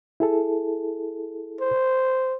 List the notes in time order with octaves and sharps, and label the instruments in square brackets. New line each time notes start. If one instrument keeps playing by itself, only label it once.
[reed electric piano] E4 G#4 A4
[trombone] C5